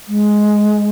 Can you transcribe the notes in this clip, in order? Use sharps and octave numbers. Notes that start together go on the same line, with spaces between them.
G#3